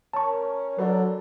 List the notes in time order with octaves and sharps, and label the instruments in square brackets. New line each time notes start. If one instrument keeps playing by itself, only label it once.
[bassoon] C#4 [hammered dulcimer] A#4 G5 A#5 [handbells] A5 C#6
[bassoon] D3 [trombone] F#3 [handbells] B4 D5 [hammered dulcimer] G5 A#5 B5